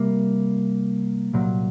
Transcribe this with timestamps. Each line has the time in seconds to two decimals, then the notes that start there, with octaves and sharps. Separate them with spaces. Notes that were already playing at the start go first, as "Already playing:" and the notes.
Already playing: C3 G3 A#3
1.34 C2 A#2 F#3